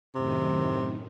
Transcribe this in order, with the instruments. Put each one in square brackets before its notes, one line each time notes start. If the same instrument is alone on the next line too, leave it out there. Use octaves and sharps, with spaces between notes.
[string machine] F#2 A2 D#3 [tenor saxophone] C3